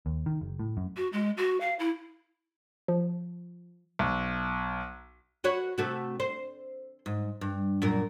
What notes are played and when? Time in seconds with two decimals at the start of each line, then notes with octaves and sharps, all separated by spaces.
0.06 D#2
0.26 D#3
0.41 F#1
0.59 A2
0.77 F#2
0.97 F#4
1.13 G#3
1.37 F#4
1.60 F5
1.79 E4
2.88 F3
3.99 B1
5.44 F#4 B4 C#5
5.78 C3 A3 F#4
6.20 C5
7.06 G#2
7.41 G2
7.82 F#2 A#2 A#4